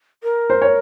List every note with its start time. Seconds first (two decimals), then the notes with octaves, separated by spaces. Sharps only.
0.23 A#4
0.50 C5
0.62 C#5